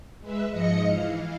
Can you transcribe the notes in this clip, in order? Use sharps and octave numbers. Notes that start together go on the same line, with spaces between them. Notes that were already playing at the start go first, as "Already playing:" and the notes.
G#3 B4 E5
G#2 F3 D#5 A#6 C#7
E3 F5